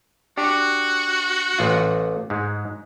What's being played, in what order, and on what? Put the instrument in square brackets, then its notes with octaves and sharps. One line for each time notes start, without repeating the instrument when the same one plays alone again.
[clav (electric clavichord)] D4 G4 [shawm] F#4
[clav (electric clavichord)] A1 F4
G#2 G#3